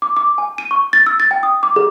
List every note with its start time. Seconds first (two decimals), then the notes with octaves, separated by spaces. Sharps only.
0.02 D6
0.17 D6
0.38 G#5
0.58 D#7
0.71 C#6
0.93 A6
1.06 E6
1.20 A6
1.31 G5
1.43 D#6
1.63 D6
1.76 G#4